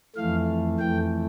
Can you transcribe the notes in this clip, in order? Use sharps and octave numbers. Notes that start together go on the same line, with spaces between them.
F2 E3 A3 F5
F2 E3 A3 G5